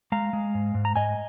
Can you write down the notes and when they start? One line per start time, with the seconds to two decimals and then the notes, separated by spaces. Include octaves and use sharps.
0.12 G#3 F5 A#5
0.33 G#3
0.55 G#2
0.74 G#2
0.85 A#5
0.96 G#2 D#5 G#5